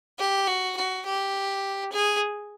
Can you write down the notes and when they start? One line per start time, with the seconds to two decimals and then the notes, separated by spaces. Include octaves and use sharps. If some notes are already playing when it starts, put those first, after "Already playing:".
0.18 G4
0.47 F#4
0.77 F#4
1.05 G4
1.92 G#4